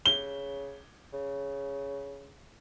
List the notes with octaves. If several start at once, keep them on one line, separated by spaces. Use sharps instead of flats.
C#3 G7
C#3